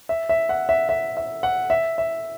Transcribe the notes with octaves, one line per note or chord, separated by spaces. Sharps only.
E5
E5
F#5
E5
E5
E5
F#5
E5
E5